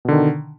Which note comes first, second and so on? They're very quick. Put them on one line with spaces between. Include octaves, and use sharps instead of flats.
B2 D3 D#3